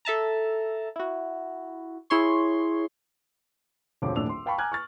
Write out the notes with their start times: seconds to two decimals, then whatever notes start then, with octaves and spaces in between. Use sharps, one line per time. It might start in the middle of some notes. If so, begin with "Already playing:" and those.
0.05 A4 E5 A5 A#5
0.96 E4 F#4
2.10 E4 G#4 C#5 C6 C#6
4.02 E1 D3 F3 C4 C#5 D6
4.16 D#1 A#1 A2 D4 E6 F7
4.29 C6
4.46 F5 G5 A5 B5 C#6
4.58 G#5 A#5 D6 F6 F#6 G#6
4.72 C#6 F6 A6